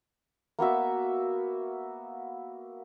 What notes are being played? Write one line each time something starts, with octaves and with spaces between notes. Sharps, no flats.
A#3 B3 F#4 E5